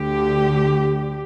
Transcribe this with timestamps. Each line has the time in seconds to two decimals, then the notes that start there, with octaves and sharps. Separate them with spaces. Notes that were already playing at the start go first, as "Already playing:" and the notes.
Already playing: D2 D3 G4